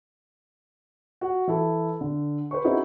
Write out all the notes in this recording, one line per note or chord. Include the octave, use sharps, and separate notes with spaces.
F#4 F#5
E3 E4 A4
D3
B4 C5 C#6
C4 C#4 D#4 E4 F#4 G#4